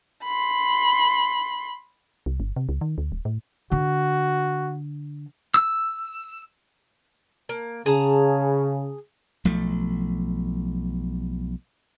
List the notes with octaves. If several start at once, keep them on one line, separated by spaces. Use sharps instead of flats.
B5 C6
C2
G1
C3
C#2
D#3
D2
D1
A2
D3 F#4
E6
A#3
C#3 G#4 A5 A#5
B1 F3 A3